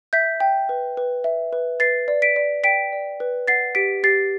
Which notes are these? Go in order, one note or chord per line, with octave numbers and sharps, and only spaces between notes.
E5 G6 B6
G5
B4
B4
E5
B4
B4 A6 C7
D5
B6 D7
D5
G5 B6 D7
D5
B4
F#5 A6 C7
G4 B6 D7
G4 A6 C7